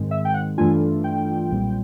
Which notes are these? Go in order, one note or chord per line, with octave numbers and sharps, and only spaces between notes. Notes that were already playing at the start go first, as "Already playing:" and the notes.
Already playing: G#2 D#3 G#3 C4
E5
G5
F#5
G2 E3 A3 D4 F4 G#5
G5
B1 A#2 G3 C4